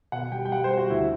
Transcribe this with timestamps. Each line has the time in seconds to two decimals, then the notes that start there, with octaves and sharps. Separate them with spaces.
0.12 B2 F#5
0.32 G3 G5
0.45 G5
0.51 G3 F#5
0.64 C5
0.71 G3
0.77 F#4
0.90 D2 E4